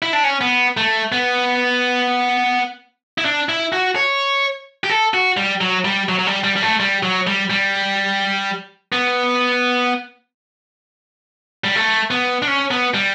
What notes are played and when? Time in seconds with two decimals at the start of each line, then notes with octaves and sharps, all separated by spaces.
0.02 E4
0.13 D4
0.24 C#4
0.41 B3
0.77 A3
1.12 B3
3.18 E4
3.25 D4
3.49 E4
3.73 F#4
3.96 C#5
4.84 G4
4.90 A4
5.14 F#4
5.37 G3
5.61 F#3
5.85 G3
6.09 F#3
6.19 F#3
6.27 G3
6.44 G3
6.56 G3
6.62 A3
6.80 G3
7.03 F#3
7.27 G3
7.50 G3
8.92 B3
11.64 G3
11.76 A3
12.11 B3
12.42 D4
12.47 C#4
12.71 B3
12.94 G3